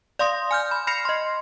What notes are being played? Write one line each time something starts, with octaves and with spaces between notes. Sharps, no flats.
D5 F5 C6 D#6 A#6
G#5 F6 G6
B5
B5 F6 A#6 C7 C#7 F7
D#5 C6